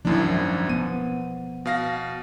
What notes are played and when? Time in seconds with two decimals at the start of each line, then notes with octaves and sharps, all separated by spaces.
0.05 G#1 F#2 F3 A#3 D4 E4
0.69 B3 D#7
1.65 B2 F5 A#6